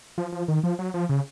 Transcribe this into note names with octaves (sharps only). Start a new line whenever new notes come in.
F3
F3
D#3
F3
F#3
F3
C#3